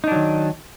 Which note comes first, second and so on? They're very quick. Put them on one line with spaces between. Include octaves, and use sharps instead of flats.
D#4 D4 F#3 D#3